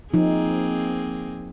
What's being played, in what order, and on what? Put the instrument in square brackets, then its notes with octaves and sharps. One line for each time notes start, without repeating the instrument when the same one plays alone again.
[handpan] F3 D#4 [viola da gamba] A#3 C4 G#4